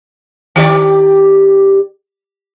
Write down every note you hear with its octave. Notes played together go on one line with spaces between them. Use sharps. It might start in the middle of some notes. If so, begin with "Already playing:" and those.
D#3 G4 D5